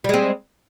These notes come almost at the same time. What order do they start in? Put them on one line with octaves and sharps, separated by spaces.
G3 G#3 C4